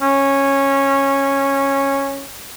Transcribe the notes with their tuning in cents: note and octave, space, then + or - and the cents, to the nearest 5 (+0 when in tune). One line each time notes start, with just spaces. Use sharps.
C#4 -10